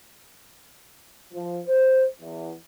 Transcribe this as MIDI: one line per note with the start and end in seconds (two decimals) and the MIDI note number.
1.34 1.60 53
1.67 2.05 72
2.21 2.52 40